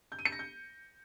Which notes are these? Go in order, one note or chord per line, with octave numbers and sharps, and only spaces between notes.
G6
D#7
C#7
A#6
G6